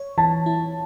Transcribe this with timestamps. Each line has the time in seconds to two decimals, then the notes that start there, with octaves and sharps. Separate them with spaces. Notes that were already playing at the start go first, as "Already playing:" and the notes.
Already playing: C#5
0.18 E3 A5
0.46 E4